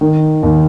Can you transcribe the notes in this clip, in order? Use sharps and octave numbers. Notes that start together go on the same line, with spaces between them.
D#3
D#2